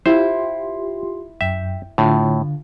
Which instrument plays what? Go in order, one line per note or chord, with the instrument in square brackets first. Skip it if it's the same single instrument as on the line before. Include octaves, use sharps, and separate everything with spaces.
[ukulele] E4 [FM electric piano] F4 G4 C6 [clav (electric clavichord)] C5
[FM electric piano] F#2 G5 [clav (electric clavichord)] E5
[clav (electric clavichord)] A2 [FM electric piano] D3 F4